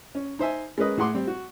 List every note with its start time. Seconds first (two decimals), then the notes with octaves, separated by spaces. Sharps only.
0.15 C#4
0.39 D#4 C5 E5 G#5
0.78 G#3 C#4 A#4 B4 D#5
0.97 A2 G#4 F#5 C6 D6
1.14 G3 C4
1.27 F#4